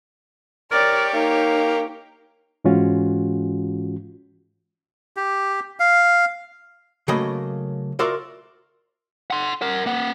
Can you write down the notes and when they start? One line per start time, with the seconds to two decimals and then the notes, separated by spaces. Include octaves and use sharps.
0.71 G4 A#4 C#5 D5
1.14 A#3 D#4
2.64 G#2 E3 G#3 C#4 F4 F#4
5.17 G4
5.80 F5
7.08 C#3 F#3 A3 A#3 D#5 B5
7.99 F4 F#4 A#4 D5 E5 C6
9.30 F#5 C6
9.62 A#4 F#5
9.86 A#3 F#5